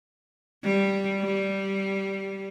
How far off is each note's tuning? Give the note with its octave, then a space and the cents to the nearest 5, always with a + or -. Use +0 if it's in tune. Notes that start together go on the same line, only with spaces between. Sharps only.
G3 +0
G3 -10